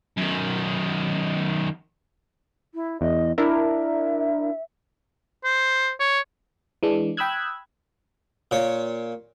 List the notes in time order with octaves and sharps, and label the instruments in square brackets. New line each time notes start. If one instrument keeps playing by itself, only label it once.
[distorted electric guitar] F#2 D#3
[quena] E4
[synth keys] E2 [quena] D#5
[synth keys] D4 E4 A#4 [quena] E5
[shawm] C5
C#5
[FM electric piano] E3 G#3 D4
G5 B5 D#6 E6 F#6 G#6
[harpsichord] A#2 C#5